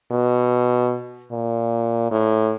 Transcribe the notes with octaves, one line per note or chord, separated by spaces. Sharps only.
B2
A#2
A2